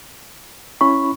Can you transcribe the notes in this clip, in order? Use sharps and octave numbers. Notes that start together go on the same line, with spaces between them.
C#4 E4 B5 C#6